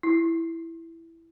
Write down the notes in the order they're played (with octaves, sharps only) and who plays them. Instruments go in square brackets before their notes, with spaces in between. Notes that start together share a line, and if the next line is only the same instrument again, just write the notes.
[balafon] E4